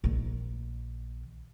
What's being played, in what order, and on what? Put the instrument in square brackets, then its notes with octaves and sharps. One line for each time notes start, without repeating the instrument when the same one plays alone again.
[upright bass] A#1 D#3